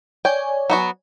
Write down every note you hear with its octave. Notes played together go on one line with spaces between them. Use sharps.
C#5 D5 G5 G#5
F#3 B3 F#4